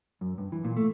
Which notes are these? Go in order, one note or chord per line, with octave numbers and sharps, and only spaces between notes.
F#2
G2
E3
A#2
A3